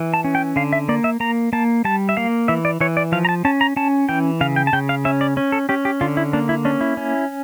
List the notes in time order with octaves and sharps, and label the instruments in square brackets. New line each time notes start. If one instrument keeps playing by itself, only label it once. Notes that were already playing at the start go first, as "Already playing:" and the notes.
Already playing: [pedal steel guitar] E3
A5
C#4
G5
D3 F5
E5
A#3 D5
E5
A#3 A#5
A#3 A5
G3 A5
E5
A#3 F5
E3 E5
D5
E3 C#5
D5
F3 F5
A#5
A5
C#4 A5
A#5
C#4 A5
E3 G5
C#3 F5
G5
A5
C#3 G5
F5
C#4 E5
D5
C#4
A4
C#4 G4
G4
D3 F4
E4
A#3 D4
E4
C#4 D4
E4
C#4